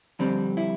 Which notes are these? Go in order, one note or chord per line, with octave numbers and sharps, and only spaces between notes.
F2 D3 G3 C4 D4
E4